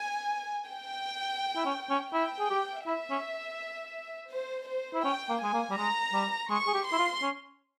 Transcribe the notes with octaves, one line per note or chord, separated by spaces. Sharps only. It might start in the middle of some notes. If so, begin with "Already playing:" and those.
Already playing: G#5
G5
E4
C#4
C#4
E4 G5
G#4
G4
E4 E5
C#4
C5
C5
E4
C#4 G5
A#3
G#3 G#5
A#3
G3
G#3 A#5
G3
G#3 C#6
G#4
G4
C6
E4
F4
C#4